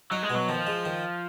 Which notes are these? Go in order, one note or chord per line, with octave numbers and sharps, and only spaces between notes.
F#3 D#4
G#3
B2
F#3
D#3 F3
G#3
D#3